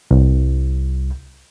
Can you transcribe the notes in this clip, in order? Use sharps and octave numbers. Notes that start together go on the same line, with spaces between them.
C2